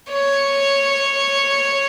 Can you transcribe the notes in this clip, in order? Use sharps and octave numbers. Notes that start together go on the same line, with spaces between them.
C#5